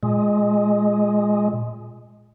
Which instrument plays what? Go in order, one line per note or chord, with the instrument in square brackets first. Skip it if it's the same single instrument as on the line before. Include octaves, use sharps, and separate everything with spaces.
[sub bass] A#2 [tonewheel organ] G#3